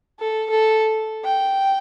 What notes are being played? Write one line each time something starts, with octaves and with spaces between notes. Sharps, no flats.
A4
A4
G5